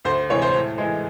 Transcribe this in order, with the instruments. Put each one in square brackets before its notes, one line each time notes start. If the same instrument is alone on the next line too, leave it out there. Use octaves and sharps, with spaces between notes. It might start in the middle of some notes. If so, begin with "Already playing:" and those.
[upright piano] D2 C5
C3 E3 G#3 C#5
C5
A2
E3 G#3